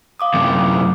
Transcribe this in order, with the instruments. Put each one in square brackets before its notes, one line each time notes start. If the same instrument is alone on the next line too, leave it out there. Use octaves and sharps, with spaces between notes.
[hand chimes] F5 D6 D#6
[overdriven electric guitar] F#2 C3